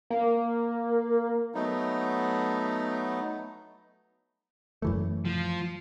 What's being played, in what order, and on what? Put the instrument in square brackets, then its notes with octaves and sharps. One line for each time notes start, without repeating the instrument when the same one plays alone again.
[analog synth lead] A#3
[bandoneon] F#3 A3 B3 D#4
[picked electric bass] F#2 E3 A3
[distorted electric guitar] F3